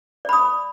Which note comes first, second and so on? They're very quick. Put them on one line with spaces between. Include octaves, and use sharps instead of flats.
D5 B5 D#6